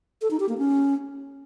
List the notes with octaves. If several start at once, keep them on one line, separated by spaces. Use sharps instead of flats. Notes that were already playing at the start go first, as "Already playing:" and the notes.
A4
D#4
G4
A#3
C#4